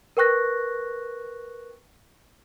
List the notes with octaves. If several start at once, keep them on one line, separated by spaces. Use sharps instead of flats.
A#4 B4 G5 C#6 F#6 A#6